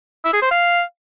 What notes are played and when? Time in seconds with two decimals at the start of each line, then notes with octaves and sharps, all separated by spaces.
0.25 E4
0.33 G#4
0.42 C5
0.51 F5